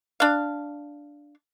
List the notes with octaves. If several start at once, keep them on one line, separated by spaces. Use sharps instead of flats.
D4 F5